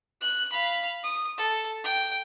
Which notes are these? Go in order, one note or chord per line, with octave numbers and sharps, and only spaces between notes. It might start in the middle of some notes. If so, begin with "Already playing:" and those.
F#6
F5 B5
D#6
A4
G5